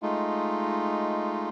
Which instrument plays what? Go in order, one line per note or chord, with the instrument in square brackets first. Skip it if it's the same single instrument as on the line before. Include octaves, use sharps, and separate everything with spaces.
[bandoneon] G#3 A3 D#4 F4